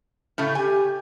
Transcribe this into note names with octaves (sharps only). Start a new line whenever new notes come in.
A2 C#3 A3
G4 G#5